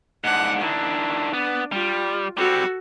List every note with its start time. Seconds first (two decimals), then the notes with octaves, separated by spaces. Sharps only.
0.24 G#2 D4 F#5
0.61 D#3 D4 E4
1.33 B3 D4
1.72 G3 F4
2.37 G3 C4 F#4 A4